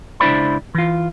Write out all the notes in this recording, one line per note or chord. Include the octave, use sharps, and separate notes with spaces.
C#2 D4 E4 C5 D5 B5
E3 F4